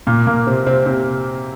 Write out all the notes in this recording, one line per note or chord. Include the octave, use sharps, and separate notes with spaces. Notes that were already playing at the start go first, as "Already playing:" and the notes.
A#2 A#3
A#2 A#3
C3 C4
C3 C4
C3 C4